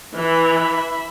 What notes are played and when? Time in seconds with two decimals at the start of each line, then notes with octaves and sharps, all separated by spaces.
0.16 E3 E5 B5